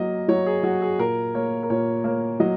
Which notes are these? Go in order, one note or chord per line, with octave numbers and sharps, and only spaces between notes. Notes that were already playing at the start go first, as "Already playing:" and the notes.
Already playing: F#3 A#3 D#5
F#3 C#5
G#4
F#3 F#4
G#4
A#2 A#4
A#3 C#5
A#4
A#2 C#5
A#3 C#5
F#3 D#5